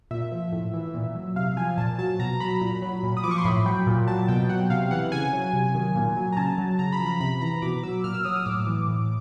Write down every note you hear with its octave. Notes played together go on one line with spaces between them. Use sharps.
A#2 E5
F3
A2
E3
A#2
F#3
C3 F5
F3 G#5
A#2 A5
F#3 A5
B2 A#5
F#3 B5
A#2
F#3
A#2
D#6
F3 D6
C#6
C6
A2 B5
F#3 G5
A#2
F#3 A5
B2 G5
F#3 F#5
C3 F5
E3 F#5
C#3 G#5
F#3
C3
D#3 F#3
A#2
F#3
A#5
C#3 A5
F#3
C#3 A#5
B5
F3
B5
C3 B5
E3 A#5
B2 D6
F#3 E6
A#2 F6
E6
F#3 D#6
D#6
A2 D6
E3
A2